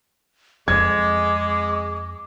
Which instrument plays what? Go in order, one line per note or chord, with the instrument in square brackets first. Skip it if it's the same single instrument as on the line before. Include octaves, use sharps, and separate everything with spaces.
[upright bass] F2 C4 [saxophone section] G#3 [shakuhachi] D6 [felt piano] G#6